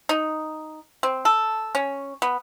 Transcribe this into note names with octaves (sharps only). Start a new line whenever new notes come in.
D#4
C4
A4
C#4
B3